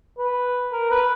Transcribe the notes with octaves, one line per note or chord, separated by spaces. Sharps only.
B4
A#4
B4